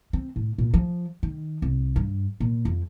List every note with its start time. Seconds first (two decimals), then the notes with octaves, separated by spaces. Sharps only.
0.13 C4
0.36 A2
0.58 A#2
0.74 F3
1.23 D#3
1.62 C2
1.96 G2
2.40 A#2
2.65 F2